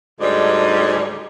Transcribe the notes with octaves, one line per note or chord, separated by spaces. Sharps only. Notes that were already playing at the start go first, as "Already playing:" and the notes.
D2 G#2 G3 D4 D#4